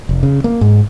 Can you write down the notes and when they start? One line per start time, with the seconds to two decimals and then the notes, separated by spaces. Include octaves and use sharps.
0.09 F1
0.23 C#3
0.44 A#3
0.61 G#2